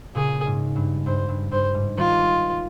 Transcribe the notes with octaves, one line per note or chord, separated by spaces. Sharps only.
A#2 C#3 G#4
G#2
G2
G2 C5
G2
G2 C5
G#2
D#3 G3 F4